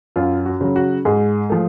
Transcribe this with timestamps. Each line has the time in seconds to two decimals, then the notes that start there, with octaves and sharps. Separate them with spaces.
0.16 F#2 F4
0.46 F#4
0.61 C#3 F#3
0.76 F#4
1.05 G#2 G#4
1.50 F3 A3